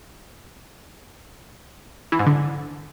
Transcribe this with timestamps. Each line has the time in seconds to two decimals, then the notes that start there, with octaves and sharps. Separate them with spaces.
2.12 E3
2.19 G#2
2.26 D3